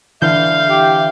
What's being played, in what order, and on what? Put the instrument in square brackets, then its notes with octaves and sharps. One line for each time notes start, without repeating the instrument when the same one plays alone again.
[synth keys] D3 E3 G6 [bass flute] E5 [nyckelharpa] F5
[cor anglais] G4